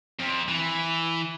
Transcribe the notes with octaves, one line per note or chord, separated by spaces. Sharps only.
F2
E3